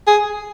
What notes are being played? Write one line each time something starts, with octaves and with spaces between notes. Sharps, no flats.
G#4